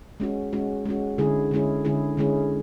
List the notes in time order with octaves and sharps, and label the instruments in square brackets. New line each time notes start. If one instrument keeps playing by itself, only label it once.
[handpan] G#3 C#4 F#4
G#3 C#4 F#4
G#3 C#4 F#4
D3 G#3 C#4 E4 G#4
D3 G#3 C#4 E4 G#4
D3 G#3 C#4 E4 G#4
D3 G#3 C#4 E4 G#4